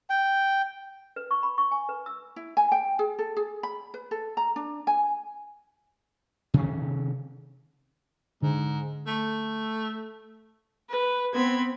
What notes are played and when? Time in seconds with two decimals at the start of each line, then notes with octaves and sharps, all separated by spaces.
0.10 G5
1.16 B4
1.31 C#6
1.43 B5
1.58 C#6
1.71 G#5
1.89 B4
2.06 E6
2.36 E4
2.57 G#5
2.72 G5
2.99 G#4
3.19 A4
3.37 G#4
3.63 B5
3.94 B4
4.11 A4
4.37 A#5
4.56 D4
4.87 G#5
6.54 C3 D#3 C#4
8.42 G#2 D3
9.07 A3
10.89 B4
11.34 B3 C4 B5 G#6